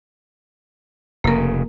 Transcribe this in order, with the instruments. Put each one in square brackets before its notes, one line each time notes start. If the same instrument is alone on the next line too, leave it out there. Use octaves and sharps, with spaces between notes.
[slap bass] F1 C#3 [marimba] A#3 A#4